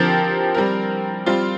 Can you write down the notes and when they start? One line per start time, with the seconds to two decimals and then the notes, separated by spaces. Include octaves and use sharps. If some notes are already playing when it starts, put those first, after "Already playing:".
Already playing: D3 F3 C4 G4 A#4
0.54 G3 C4 A#4
1.26 G3 C4 F4